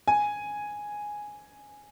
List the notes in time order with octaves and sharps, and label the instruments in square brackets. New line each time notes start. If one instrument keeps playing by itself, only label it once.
[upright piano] G#5